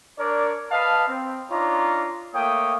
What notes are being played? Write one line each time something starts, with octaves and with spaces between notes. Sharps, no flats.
D4 A#4 C#5 D5
B4 D#5 F5 A5
C4
D4 D#4 F4 C#5 A#5 D6
A3 A#3 C#5 G5 D#6